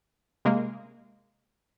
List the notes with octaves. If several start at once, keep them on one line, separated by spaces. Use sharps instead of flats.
C3 G#3 A#3